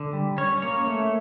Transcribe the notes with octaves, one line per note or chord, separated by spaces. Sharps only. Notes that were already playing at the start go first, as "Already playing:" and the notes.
Already playing: D3
G3
C#4 C#5
A#3 C#5
A3